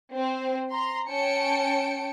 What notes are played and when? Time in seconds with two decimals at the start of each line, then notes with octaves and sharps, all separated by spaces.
0.13 C4 C5
0.72 A#5 C6
1.08 C#4 G5 A5 C#7 D7